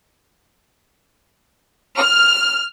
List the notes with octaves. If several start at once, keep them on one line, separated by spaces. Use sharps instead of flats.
F6